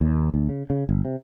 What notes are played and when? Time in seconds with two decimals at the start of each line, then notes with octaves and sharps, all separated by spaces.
0.01 D#2
0.34 D2
0.49 C#3
0.70 C#3
0.89 G1
1.05 C3